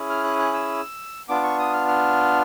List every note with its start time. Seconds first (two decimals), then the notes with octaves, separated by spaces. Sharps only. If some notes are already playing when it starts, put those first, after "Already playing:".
Already playing: C#4 E4 G#4
0.10 F6
0.24 F#6
0.39 F#6
0.54 E6
1.29 B3 D4 F4 D6
1.43 C#6
1.59 D#6
1.73 F6
1.88 F6